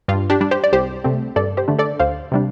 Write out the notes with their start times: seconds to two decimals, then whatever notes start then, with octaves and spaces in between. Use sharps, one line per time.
0.08 G2 F4
0.30 D4 G4
0.41 G3 D4
0.51 G4 C5
0.64 D5
0.72 C2 G4 C5
1.04 C3 A3 C4
1.36 G2 A4 D5
1.57 G4 C5
1.68 D3 A3 D4
1.79 A4 D5
2.00 D2 C5 F5
2.32 C3 G3 D4